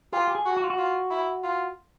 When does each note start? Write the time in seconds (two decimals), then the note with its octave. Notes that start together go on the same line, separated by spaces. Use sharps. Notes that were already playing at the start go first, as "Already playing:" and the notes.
0.12 F4 G4
0.28 G4
0.35 G#4
0.46 F#4
0.57 F#4
0.64 F4
0.70 F#4
0.78 F4
1.11 E4
1.44 F4